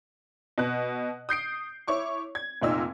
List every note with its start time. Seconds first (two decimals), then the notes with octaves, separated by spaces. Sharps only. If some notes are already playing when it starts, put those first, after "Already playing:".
0.58 B2 F#6
1.29 D#6 G6 C7 D7
1.87 E4 C#5 C#6 D6
2.35 G#6
2.62 F1 A#2 D#4 E6